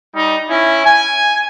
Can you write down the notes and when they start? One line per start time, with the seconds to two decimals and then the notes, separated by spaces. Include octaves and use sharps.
0.13 G3 D#4
0.50 C#4 E4
0.85 G#5